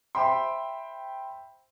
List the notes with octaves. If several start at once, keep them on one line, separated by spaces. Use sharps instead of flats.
C5 E5 G5 B5 C6